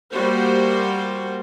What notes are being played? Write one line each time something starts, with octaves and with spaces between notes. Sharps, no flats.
G3 A#3 F#4 C5